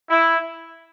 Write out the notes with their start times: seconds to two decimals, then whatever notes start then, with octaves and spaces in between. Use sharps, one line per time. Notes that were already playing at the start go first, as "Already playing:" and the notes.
0.09 E4